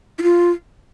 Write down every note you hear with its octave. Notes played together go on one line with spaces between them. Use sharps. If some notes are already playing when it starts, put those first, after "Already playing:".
E4
F4